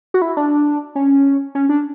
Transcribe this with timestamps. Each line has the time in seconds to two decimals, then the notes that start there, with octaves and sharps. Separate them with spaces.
0.14 F#4
0.22 E4
0.37 D4
0.95 C#4
1.55 C#4
1.69 D4